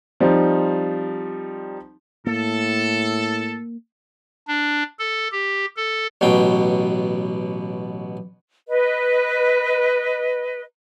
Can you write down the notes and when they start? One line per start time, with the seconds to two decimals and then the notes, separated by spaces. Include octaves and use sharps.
0.20 F3 G3 C4 D#4
2.27 A2 A#3 A4
4.47 D4
4.99 A4
5.32 G4
5.76 A4
6.21 A1 B2 F#3 G5
8.68 B4 D#5